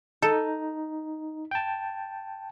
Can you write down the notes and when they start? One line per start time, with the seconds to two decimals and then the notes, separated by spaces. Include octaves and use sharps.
0.22 D#4 A4
1.51 G5 A5